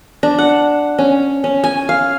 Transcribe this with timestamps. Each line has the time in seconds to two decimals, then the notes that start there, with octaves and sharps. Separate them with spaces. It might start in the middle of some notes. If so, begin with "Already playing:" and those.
0.23 D4
0.39 F#5
0.98 C#4
1.44 C#4
1.64 G#5
1.89 F5